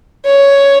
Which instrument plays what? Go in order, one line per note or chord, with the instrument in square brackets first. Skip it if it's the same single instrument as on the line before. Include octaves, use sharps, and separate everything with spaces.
[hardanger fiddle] C#5